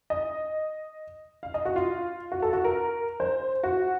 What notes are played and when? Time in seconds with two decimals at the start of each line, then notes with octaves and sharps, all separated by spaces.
0.10 D#5
1.43 F5
1.54 D#5
1.65 F#4
1.76 F4
2.32 F#4
2.42 A4
2.53 F#4
2.64 A#4
3.20 C5
3.63 F#4